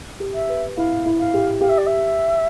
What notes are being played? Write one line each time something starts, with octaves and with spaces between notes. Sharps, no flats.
G4
E5
B4
E4 F5
E4
F5
G4
G4 F5
E5
D5
E5